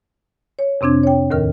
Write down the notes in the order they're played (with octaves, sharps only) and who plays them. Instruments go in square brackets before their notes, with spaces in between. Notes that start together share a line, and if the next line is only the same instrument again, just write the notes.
[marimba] C#5
F2 C3 C4 D4 G#6
C#5 G5
D#2 A2 D#3 A#4 F6